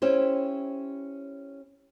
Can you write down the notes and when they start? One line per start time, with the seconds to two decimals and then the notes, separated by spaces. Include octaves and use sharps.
0.02 C#4 E4 G4 C5